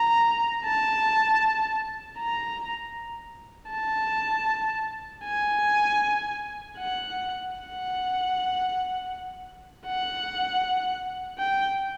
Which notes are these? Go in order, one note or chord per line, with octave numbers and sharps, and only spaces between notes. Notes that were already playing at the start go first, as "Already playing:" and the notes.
Already playing: A#5
A5
A#5
A5
G#5
F#5
F#5
F#5
G5